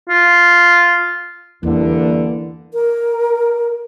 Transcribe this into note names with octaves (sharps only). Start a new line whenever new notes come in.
F4
E2 G2 D3 E3 G3 A#3
A#4